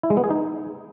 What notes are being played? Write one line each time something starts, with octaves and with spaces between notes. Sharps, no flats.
E4
G#3
B3
G#4
D#4